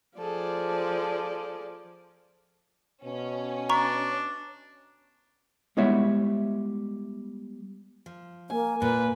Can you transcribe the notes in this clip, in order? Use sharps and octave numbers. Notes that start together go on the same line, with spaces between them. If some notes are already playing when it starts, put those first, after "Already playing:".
F3 G#4 A4 D5
B2 C#4
D4 A#5 C#6
G3 G#3 B3 E4 C#5 E5
F3
A#3 G#5
A#2 A#3 B4